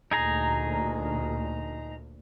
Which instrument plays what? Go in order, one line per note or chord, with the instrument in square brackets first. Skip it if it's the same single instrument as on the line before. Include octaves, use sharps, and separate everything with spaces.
[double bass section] D2 A#2 [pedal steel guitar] D#4 G#4 A#5